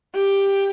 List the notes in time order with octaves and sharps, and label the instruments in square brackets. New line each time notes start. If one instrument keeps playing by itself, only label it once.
[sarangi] G4